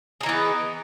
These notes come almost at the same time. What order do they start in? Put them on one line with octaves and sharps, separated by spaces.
G#4 D#4 E3 B3